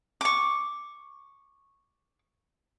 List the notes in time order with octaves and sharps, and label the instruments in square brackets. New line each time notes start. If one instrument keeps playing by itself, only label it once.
[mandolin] C#6 D6